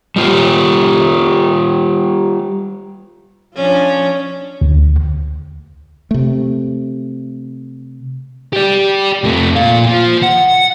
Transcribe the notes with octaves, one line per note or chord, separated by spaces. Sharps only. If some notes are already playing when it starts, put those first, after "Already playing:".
G3 F4 G4
F3 C#4 D4
D2
C3 A3
G4 D5
F2 A3
A#2 F5
F3
F#5